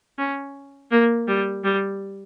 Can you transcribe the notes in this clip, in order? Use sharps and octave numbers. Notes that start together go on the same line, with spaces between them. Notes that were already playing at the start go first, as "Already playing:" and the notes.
C#4
A#3
G3
G3